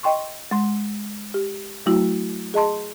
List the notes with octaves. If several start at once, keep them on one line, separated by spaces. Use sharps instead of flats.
D#5 G5 C6 C#6
G#3 C6
G4
F#3 A3 E4 F#4
G#4 D#5 A5 C6